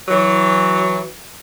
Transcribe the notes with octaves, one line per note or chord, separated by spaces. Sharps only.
E3 F#3